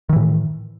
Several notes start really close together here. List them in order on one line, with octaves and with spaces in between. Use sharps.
D#3 E3 A2